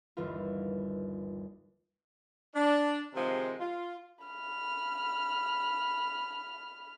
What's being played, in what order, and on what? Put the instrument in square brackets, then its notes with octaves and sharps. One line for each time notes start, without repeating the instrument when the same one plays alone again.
[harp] G1 D#2 E3 F4
[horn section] D4
C3 D#3 F3 G#3
F4
[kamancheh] B5 F6